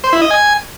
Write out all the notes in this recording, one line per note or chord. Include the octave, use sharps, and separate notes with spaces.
C5
E4
D#5
G#5